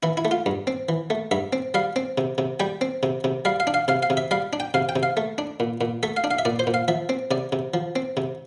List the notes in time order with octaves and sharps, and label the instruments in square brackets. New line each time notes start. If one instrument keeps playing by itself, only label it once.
[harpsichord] E3 E4
E4
A3
F4
G2
C4
E3
A3
G2 E5
C4
G3 F5
C4
C3
C3
G3 G5
C4
C3
C3
G3 F5
F5
D4
F5
C3 F5
F5
C3
E5
G3 F5
D4
G5
C3 F5
G5
C3
F5
A3
D4
A#2
A#2
A3 E5
F5
D4
F5
E5
A#2 D5
C5
A#2
F5
F3 E5
C4
C3 D5
C3
F3
C4
C3